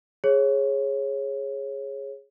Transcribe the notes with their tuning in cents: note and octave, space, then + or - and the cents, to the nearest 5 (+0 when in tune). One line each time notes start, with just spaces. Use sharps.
G#4 +0 C#5 -20